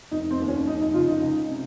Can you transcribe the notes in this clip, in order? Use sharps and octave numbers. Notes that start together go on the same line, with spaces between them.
F1 D#4
C4
D#2
C#4
F1 D#4
D#4
C#3 F4
D#4
C#2
C3